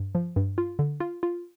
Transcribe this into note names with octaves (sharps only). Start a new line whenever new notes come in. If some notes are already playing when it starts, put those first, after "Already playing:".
Already playing: G2
F3
G2
F4
D3
F4
F4